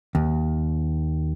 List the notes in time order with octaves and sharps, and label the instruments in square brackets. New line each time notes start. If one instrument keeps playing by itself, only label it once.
[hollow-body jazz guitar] D#2